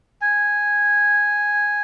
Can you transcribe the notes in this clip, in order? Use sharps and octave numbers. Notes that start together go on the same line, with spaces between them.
G#5